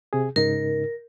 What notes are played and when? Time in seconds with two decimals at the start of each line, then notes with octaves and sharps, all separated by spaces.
0.13 C3 G#4
0.36 G#2 C#3 D#4 A#4